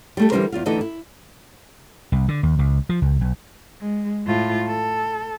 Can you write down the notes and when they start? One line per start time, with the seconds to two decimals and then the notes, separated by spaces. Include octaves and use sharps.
0.17 G3 A3 A4
0.32 D3 E3 G3 D#4 A#4 C5
0.52 E2 F4 F5
0.66 D2 D3 E3 D#4 A4 D#5
0.81 E4
2.12 C2
2.28 D3
2.43 D#2
2.59 C#2
2.89 F3
3.02 C#2
3.21 B1
3.81 G#3
4.26 A2 F4
4.67 A4